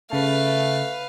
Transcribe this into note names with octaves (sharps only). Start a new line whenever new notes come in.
C#3 A3 B4 F5 A5